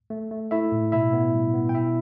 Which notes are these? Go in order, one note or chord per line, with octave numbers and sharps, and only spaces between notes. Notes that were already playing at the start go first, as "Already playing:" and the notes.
A3
A3
A3 E4 E5
A2
B2 E4 E5
B3
G3
B3
G5
B2 E4 E5